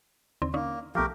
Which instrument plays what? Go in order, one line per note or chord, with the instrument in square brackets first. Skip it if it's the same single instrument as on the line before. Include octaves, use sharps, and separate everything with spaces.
[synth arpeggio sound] D#2 D3 C4
[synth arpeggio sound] D3 C#4 D#4 [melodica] A#3
[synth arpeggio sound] B1 F3 [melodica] A3 G4 A#4